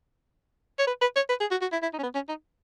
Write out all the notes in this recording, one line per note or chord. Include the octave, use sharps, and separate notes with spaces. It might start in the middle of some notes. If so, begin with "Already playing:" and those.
C#5
B4
B4
C#5
B4
G#4
F#4
F#4
E4
E4
D#4
C#4
B3
C#4
D#4